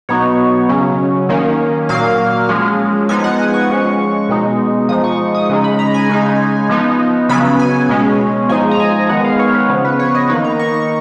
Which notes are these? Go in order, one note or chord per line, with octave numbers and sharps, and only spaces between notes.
B2 F#3 B3 D#4 C#5
C#3 F#3 C#4
D#3 A#3 C#4
A#2 F#3 A#3 F5
F3 G#3 C#4
F3 G#3 B3 D#4 G#5
F#5
G#5
C#6
F3 G#3 C#4
B2 G#3 D#4
F3 G#3 D#4 D#6
C#6
D#6
C#3 G#3 D#4
B5
A#5
G#5
C#3 G#3 D#4
F3 B3 D#4
C#3 F#3 B3 B5
G#5
B2 G#3 C#4
F3 G#3 D#4 G#5
A#5
G#5
D#3 G#3 B3 F#5
F5
C#5
B4
C#3 F3 B3
B4
C#5
D#5
D#3 A#3 D#4 B4
A#5
C#6
C#6